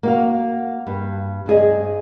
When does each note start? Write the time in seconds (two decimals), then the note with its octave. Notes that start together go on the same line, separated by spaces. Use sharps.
0.03 A#3 F#4 F5
0.87 G2
1.46 G2 C4 G#4 D#5